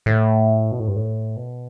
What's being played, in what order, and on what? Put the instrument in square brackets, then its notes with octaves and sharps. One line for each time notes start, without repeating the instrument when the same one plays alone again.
[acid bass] A2
B2
A2
G2
A2
B2